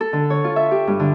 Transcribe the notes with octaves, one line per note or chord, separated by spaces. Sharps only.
A4
D3
C#5
F4
E5
G4
G2
D3